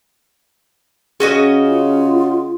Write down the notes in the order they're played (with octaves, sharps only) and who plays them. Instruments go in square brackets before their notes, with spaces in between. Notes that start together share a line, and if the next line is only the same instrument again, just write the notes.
[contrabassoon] C#3 [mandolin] C#4 F#4 D#5 [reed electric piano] G#4
[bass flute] F4